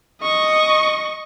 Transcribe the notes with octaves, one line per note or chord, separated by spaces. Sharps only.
D#5 C#6